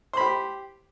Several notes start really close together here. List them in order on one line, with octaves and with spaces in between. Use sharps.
C5 B5 G4